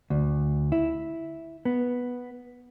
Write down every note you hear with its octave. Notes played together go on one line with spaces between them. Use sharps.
D2
E4
B3